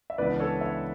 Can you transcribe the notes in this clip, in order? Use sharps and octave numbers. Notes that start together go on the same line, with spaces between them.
E5
C#2 C#3 E3 B3 D4 B4 D5
A4 C#5
C#5 E5